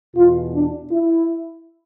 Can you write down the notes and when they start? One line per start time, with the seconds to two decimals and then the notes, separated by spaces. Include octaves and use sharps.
0.14 E2 B2 F4
0.53 D4
0.91 E4